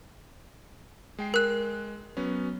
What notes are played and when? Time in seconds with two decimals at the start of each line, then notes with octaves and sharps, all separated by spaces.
1.18 G#3 G5 C7
1.34 A#4 F#6
2.17 F#3 B3 C#4